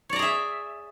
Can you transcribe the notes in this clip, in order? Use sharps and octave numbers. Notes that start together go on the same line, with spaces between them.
G#4 C#5 D5 E5 A#5